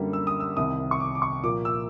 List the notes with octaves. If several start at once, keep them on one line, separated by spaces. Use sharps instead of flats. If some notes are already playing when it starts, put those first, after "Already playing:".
Already playing: F#2 D3 G3 A#3
E6
D#6
E6
C2 C3 D#3 D#6
C#6
D6
D6
C#6
A#2 F3 A#3 D6
E6